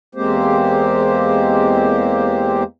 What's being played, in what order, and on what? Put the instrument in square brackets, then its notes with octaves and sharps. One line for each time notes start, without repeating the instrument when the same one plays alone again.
[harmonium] E2 G#3 A#3 C4 G4 C5